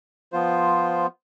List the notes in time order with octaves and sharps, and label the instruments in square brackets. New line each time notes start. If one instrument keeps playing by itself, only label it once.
[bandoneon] F3 B3 F4 C5